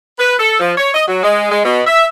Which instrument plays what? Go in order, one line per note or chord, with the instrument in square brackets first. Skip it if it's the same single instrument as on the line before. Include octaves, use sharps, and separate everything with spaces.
[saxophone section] B4
A4
F3
C#5
D#5
F#3
G#3
G#3
B2
E5